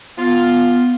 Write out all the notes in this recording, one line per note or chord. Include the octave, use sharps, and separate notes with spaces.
B3 F4